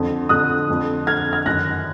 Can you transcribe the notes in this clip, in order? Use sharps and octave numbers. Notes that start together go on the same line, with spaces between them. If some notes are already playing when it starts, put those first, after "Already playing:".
Already playing: F2 D3
F2 D3 D#6 F#6
F2 D3
F2 D3 F6 G#6
F6 G#6
F#2 D#3 F#6 A#6